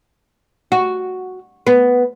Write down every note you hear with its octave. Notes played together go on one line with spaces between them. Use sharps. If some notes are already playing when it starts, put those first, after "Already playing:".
F#4
B3